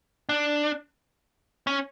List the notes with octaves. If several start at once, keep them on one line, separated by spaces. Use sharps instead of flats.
D4
C#4